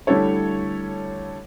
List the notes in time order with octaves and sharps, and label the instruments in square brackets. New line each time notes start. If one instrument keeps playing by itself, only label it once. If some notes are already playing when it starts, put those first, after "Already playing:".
[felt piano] D3 G3 A3 E4 A4 C#5